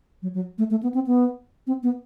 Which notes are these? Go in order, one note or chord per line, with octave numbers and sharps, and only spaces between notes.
F#3
F#3
A3
A3
B3
C4
B3
C4
B3